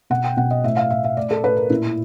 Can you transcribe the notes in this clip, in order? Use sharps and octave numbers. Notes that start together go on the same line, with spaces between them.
B2 F#5
G5
B2 F#5
D#5
A2 E5
F5
A2 E5
E5
A2 D5
A4
A2 B4
A#4
A#2 E4